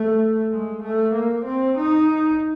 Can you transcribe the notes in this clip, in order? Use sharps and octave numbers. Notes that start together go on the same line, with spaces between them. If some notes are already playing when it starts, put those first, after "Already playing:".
Already playing: A3
G#3
A3
A#3
C4
D#4